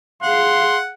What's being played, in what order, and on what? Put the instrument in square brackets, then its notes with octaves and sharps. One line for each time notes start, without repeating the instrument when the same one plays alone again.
[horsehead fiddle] G#4 F5 [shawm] F#5 [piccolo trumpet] C6